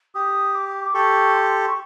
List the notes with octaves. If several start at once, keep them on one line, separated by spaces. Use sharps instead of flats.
G4 D#6
D6
D6
G4 A4 C#6
C6
C#6